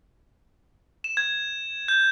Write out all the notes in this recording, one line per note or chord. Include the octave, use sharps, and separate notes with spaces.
E7
G#6
G6